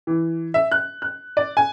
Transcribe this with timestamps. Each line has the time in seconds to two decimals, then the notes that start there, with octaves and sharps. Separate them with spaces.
0.07 E3
0.54 E5
0.71 F#6
1.02 F#6
1.37 D5
1.57 G#5